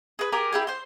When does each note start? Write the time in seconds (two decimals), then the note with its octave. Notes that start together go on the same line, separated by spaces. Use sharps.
0.19 G#4 B4
0.32 G4 G#4 A#4 G#5
0.52 E4 G4 G#4
0.67 C5 C6